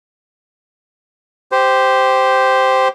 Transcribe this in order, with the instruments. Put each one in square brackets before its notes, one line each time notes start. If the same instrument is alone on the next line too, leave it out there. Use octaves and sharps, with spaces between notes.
[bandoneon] G4 C5